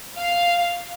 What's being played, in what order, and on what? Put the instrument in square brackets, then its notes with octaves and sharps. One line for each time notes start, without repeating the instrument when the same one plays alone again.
[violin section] F5